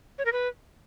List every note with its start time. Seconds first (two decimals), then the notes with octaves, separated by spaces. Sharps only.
0.18 C#5
0.25 A#4
0.33 B4